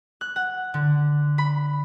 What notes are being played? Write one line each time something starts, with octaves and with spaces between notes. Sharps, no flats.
F#6
F#5
D3
B5